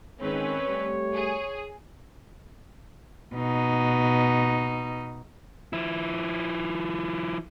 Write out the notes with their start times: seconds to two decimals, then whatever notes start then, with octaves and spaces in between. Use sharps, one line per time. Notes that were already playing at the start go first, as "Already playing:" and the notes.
0.21 G#2 D#3 G#3 C4 C#4 B4 C#5
0.68 G3 A3 G4
1.14 G#4
3.35 B2 D#4
5.73 F3 E4